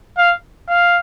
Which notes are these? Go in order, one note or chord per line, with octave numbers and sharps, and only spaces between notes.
F5
F5